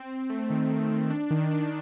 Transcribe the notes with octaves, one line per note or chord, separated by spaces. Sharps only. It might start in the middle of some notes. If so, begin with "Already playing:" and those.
Already playing: C4
C4
A3
D#3
D#3
D#3
D4
D#3
D4